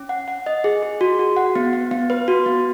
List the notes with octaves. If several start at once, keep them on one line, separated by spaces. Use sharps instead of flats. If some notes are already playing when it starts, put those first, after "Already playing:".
Already playing: C#4
F#5
F#5
D#5
G#4
G#4
F#4
F#4
F#5
B3
B3
B3
B4
F#4
B3